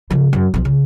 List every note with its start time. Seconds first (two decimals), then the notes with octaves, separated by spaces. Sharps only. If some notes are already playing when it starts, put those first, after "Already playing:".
0.10 C#3 F3
0.33 F#2
0.54 B1 F3
0.65 C#3